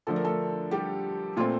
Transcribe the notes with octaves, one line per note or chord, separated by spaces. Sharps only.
D3 F3 A3 D4 A4
A#4
A3 A4
G3 G4
A#2 A3 C4 F4